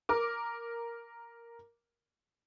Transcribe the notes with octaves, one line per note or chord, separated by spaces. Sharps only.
A#4 D6